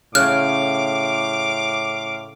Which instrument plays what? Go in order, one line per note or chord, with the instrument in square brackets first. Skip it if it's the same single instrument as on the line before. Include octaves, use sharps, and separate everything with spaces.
[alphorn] A2 [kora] C#3 C#4 [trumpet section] F5 D6 [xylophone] F6 F#6